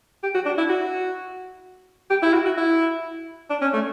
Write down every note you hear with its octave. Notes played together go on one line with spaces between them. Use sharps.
G4
F#4
D4
E4
F#4
G4
E4
F#4
F#4
E4
D4
C#4
A3